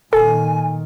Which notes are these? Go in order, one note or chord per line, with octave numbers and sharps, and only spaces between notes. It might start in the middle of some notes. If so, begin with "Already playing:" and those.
A#2 D#3 A4 G#5